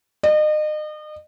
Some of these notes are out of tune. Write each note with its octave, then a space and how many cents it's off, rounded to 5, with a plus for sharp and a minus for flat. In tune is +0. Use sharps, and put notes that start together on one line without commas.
D#5 -35